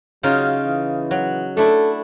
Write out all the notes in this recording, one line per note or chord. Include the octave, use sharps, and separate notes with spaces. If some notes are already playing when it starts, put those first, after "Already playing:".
C#3 F#3 D#4 F4
E3
F#3
A3 D4 E4 A4